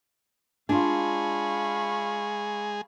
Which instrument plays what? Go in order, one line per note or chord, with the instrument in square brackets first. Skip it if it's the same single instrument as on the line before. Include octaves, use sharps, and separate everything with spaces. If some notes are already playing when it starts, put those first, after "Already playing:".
[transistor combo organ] G#3 G#4 [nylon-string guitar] D4 F4 [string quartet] F5 B5 C#6